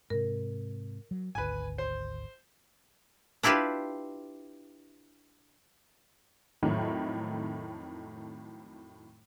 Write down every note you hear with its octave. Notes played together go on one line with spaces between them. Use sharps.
G#2 C3 A#4
F#3
G#1 D2 B4 G#5
C5
D4 E4 F4 G4 B4
F2 A2 D#3 F#3 A3